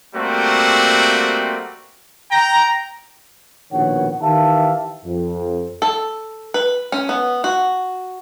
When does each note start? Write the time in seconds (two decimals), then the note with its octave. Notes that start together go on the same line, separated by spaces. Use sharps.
0.15 G3 A3 A#3 C4 F#4
2.30 G5 A#5
3.73 A#1 B2 D#3 F#4 C#5 F#5
4.22 D#3 E3 G4 E5 F5 A5
5.05 F2
5.82 A4
6.54 B4
6.92 C#4
7.09 B3
7.44 F#4